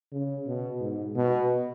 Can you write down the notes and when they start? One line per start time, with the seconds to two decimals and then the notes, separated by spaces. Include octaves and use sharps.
0.12 C#3
0.46 B2
0.81 G#2
1.16 B2